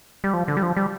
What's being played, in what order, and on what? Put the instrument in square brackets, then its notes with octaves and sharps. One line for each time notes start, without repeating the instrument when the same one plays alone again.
[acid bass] G3
F3
D3
G3
F3
G3